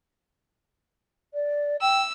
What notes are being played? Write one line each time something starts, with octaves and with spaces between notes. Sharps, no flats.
D5
G5 E6